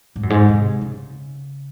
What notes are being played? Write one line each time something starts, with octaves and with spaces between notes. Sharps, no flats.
G#2
F#2
G#2
C3
C#3